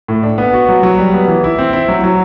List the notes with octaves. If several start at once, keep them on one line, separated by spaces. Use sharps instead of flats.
A2
D4
B3
F#4
F#3
F#3
G3
B3
E3
E4
C4
E4
F#3
F#3